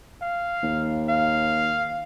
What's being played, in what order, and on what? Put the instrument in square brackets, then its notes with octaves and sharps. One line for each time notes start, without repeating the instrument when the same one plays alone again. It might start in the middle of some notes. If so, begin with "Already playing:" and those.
[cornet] F5
[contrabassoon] D#2
[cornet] F5